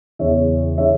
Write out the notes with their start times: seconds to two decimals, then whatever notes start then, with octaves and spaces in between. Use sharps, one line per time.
0.19 E2 C#3 E3 C#5 E5
0.77 C#3 E3 C#5 E5